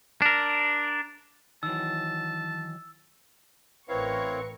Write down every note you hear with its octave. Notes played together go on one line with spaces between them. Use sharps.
D4 A#4
D#3 E3 F#3 A5 E6
A1 C4 E4 A#4 B4 C#5 F5 C#6